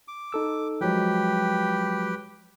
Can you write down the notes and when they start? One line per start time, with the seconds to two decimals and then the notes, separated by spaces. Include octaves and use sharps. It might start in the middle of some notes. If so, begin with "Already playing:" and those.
0.08 D6
0.32 D#4 A4 E6
0.81 F3 F#3 G#3 G4 B4 G5